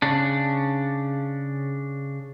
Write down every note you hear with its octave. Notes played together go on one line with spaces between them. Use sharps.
C#3 D4